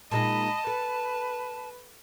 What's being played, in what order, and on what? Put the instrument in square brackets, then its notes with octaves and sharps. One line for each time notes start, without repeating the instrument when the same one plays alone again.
[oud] A#2 G#3 D#4 [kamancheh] D#5 B5 [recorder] A5
[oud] A4 [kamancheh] B4